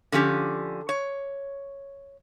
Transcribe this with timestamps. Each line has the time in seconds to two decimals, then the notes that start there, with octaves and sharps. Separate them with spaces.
0.12 D3 F3 C#4 G4
0.89 C#5